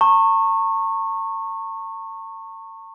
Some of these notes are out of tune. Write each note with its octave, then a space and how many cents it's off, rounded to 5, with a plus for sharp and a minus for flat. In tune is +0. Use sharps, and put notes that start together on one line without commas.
A5 +45 C#6 -20